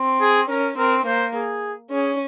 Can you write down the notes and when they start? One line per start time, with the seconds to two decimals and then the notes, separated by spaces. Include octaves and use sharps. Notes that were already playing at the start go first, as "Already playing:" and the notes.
Already playing: C4
0.21 G#4
0.49 C#4 A#4
0.77 C4 A#4
1.06 A#3 C5
1.34 G#4
1.91 C#4 G#4